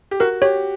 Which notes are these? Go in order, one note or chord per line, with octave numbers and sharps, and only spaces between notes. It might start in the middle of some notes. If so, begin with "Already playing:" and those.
G4
F#4 A#4
G4 C#5